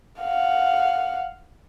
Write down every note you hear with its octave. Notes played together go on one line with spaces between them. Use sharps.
F5 F#5